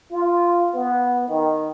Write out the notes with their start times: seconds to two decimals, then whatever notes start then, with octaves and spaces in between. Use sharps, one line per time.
0.11 F4
0.74 B3
1.28 D#3